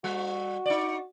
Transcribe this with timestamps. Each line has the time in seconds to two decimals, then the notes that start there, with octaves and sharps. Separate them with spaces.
0.04 G3 F#4
0.66 D#4 D5